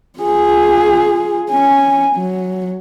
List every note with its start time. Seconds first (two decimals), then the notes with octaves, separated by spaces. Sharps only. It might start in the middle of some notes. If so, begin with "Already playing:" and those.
0.19 F4 G#4
1.51 C#4 G#5
2.16 F#3